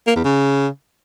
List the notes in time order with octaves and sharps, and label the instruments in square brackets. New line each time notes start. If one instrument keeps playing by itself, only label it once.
[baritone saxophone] A#3
E2
C#3